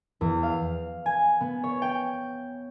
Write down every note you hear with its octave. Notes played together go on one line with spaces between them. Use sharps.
E2
F5
G#5
B3
C#5
G5